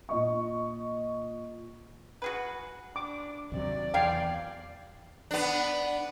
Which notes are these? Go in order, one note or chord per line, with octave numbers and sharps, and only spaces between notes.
A#2 D#5 C#6
F#4 G#4 B4
D4 D6
D#2 C3 F#3 D5
E2 G#4 F5 G5
B3 D4